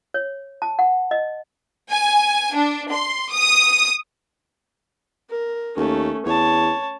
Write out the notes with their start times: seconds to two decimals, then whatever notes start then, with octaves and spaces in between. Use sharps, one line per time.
0.14 C#5
0.62 A5
0.79 F#5
1.11 D#5
1.91 G#5
2.56 D4
2.93 C6
3.33 D#6
5.29 A#4
5.77 D#2 A3 C#4
6.26 E2 C#5 A5